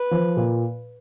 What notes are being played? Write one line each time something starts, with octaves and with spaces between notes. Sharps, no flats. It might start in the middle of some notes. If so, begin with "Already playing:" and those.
Already playing: B4
F3
A#2